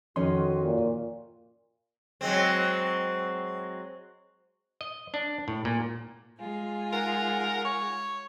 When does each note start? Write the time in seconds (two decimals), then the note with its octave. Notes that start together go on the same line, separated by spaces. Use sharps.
0.16 F2 D#3 C#4 F#4 C#5 D#5 C6
0.63 A#2
2.21 F#3 G#3 C4
4.81 D#5
5.14 D4
5.48 A2
5.65 A#2
6.39 G#3 F4 G#5
6.93 D#4 G#4 A#4 F#5
7.65 C#5